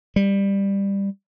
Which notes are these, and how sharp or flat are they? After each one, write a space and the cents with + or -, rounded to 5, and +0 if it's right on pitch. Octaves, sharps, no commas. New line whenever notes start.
G3 +15